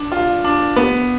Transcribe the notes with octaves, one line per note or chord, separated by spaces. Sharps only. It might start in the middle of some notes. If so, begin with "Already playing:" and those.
Already playing: D4
F4
D4
B3